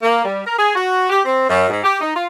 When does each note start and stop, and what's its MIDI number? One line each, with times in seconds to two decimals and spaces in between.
0.03 0.25 58
0.25 0.41 55
0.46 0.55 70
0.57 0.73 68
0.75 1.08 66
1.09 1.20 67
1.25 1.46 60
1.48 1.69 42
1.69 1.82 44
1.84 1.98 67
2.00 2.12 63
2.14 2.26 65